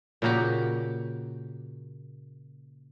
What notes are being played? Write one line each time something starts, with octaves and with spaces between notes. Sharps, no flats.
A#2 C#3 A#3 F#4 G4